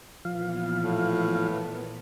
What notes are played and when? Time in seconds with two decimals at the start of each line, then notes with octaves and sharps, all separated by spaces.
0.25 A#2 E3 F3 B3 F5
0.83 A2